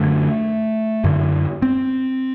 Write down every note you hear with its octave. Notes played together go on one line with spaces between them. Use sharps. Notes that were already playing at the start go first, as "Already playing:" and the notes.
Already playing: F#2 D3 A3
F#2 D3
C4